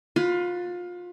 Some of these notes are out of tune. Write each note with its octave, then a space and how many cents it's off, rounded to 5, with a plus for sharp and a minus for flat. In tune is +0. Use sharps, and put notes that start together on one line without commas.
F4 +25 B4 +0 C6 -25